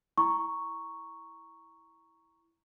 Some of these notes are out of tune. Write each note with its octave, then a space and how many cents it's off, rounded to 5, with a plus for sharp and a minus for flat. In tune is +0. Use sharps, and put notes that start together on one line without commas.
E4 +0 A#5 +0 C#6 +0